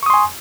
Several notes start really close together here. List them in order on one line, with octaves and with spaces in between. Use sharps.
C#6 D#6 C6 G#5